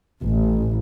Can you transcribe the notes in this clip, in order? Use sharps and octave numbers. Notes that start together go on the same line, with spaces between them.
A1